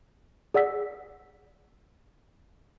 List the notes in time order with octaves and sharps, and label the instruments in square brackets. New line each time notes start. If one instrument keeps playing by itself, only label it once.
[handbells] G#4 D5 F#5 E6 B6